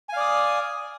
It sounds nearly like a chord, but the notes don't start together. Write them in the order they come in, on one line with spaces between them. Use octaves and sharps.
G#5 F5 D5 D#6